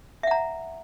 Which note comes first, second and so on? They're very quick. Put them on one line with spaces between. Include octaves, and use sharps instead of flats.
E5 F#5 A#5